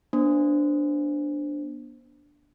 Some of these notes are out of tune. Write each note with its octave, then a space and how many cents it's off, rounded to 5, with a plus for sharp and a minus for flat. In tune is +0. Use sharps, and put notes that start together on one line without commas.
B3 -35 D4 +0 C5 +0